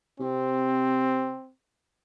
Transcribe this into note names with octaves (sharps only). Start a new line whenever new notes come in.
C3 C4